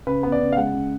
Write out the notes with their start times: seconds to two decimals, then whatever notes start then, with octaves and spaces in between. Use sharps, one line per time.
0.07 C#3 B4
0.23 B3
0.32 D5
0.41 C#3
0.52 F5
0.57 G#3 F#5
0.74 C#3